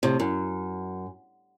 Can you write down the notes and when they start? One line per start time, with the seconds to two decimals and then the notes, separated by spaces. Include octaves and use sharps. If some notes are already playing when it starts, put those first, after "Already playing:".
0.03 A2 C3
0.20 F#2